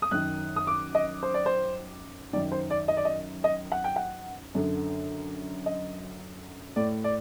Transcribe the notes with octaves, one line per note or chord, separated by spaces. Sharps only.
D#6
F#2 D#3 F#6
D#6
D6
D#5
C5
D5
C5
F#2 D#3 D5
C5
D5
D#5
D5
D#5
D#5
F#5
G5
F#5
F#2 D3
D#5
A2 D5
D5